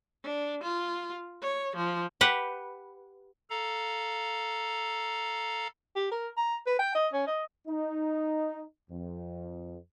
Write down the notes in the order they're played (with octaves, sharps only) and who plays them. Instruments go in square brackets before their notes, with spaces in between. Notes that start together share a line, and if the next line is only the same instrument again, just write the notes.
[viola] D4
F4
C#5
F3
[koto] G4 B4 F#5
[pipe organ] A4 F5 A#5
[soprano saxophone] G4
A#4
A#5
B4
G5
D#5
C#4
D#5
[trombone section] D#4
F2